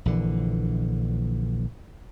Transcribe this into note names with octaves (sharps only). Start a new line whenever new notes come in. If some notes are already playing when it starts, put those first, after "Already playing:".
A#1 D3 E3